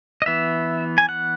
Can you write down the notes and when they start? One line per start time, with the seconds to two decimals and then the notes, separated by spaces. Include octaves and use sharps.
0.22 D#5
0.26 E3 B3 E5
0.98 G#5
1.09 F#5